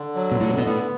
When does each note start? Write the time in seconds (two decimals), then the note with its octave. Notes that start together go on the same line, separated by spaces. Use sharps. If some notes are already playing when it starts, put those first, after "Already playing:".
Already playing: D3
0.15 F#3
0.31 B2
0.40 A2 D3
0.53 C3
0.57 B2
0.66 A2 B3